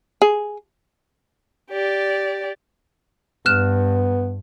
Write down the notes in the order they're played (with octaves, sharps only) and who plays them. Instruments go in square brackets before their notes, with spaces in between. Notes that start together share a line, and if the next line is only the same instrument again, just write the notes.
[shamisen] G#4
[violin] G4 D5
[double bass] G2 [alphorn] B3 [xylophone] F6 F#6 E7